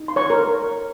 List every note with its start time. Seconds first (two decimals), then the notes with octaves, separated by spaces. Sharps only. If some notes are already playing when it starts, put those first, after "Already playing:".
Already playing: D#4
0.08 C6
0.16 C#5 C#6
0.30 A#4 C#5